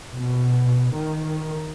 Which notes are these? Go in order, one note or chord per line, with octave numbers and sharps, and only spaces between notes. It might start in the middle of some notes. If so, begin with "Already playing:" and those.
B2
D#3